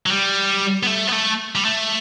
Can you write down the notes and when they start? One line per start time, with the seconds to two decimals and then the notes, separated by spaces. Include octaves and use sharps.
0.06 F#3
0.10 G3
0.83 B3
0.87 A3
1.08 B3
1.13 A3
1.55 G3
1.65 A3